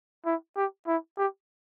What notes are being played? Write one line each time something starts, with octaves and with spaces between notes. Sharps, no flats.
E4
G4
E4
G4